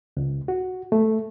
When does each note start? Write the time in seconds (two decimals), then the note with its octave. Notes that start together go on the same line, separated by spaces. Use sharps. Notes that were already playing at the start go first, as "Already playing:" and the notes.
0.17 C#2
0.48 F#4
0.92 A3